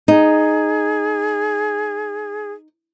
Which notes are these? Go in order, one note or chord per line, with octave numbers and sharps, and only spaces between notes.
D#4 G#4